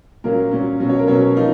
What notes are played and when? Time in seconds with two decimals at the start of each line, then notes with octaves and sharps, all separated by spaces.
0.24 A#2 F#3 A#3 C#4 A#4
0.51 A#2 F#3 A#3 C#4
0.80 B2 F#3 C#4
0.89 C#5
0.99 A#4
1.07 B2 F#3 C#4 C#5
1.36 F3 A#3 D#4